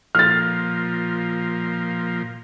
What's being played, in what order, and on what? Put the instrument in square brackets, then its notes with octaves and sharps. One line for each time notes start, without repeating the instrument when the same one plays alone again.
[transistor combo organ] A#2 F3 [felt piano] F6 A6